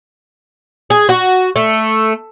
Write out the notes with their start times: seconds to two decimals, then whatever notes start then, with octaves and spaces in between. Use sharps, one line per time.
0.90 G#4
1.09 F#4
1.56 A3